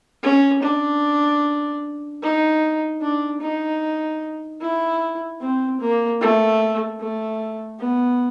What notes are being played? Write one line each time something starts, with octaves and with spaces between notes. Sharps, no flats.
C#4
D4
D#4
D4
D#4
E4
C4
A#3
A3
A3
B3